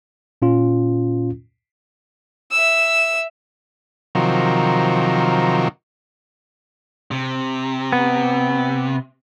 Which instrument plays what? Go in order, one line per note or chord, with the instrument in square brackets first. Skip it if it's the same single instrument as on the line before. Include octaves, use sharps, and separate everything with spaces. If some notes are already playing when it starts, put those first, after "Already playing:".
[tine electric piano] A#2 C#4 F4
[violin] E5 E6
[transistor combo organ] C3 D#3 F3 F#3 A#4
[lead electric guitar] C3
[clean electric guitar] B3